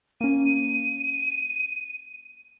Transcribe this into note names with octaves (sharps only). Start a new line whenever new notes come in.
A#3 C#4 D#7